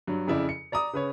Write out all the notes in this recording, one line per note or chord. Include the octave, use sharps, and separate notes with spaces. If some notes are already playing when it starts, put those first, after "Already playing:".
G2 F#3
F2 C#3 E4 D5
C#7
D5 A#5 D6 D#6
C#3 B4 C#5